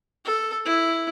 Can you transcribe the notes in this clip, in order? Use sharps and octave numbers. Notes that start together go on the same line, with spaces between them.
A4
E4